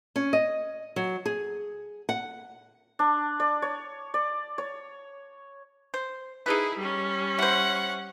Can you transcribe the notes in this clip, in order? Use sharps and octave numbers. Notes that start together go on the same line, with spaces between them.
C#4
D#5
F#3
G#4
F#5
D4
D5
C#5
D5
C#5
C5
D#4 E4 G#4 A4 B4
G3 C#4
E4 C5 F#5